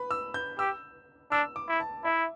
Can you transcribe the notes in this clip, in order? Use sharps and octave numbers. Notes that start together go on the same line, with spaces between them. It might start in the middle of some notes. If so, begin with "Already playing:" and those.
Already playing: B4 B5
E6
G6
G4 E6
D4 E6
D6
E4
A5
E4 E5